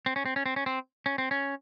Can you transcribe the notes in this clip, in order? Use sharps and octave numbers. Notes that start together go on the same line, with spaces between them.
C4
C#4
C4
C#4
C4
C#4
C4
C#4
C4
C#4